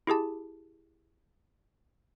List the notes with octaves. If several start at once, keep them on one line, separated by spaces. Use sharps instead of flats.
E4 G4 G#4 A5